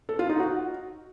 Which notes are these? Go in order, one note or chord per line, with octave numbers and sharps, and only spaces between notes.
A4
F4
D#4
F#4